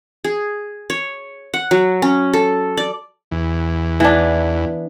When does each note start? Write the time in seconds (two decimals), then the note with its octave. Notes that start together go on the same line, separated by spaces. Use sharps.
0.24 G#4
0.90 C#5
1.54 F#5
1.71 F#3
2.02 C#4
2.33 A4
2.77 D5
3.31 E2
4.00 E3 B3 D4